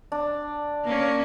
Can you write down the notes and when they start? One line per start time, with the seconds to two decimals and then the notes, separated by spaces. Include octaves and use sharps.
0.12 D4
0.84 A#3 C#4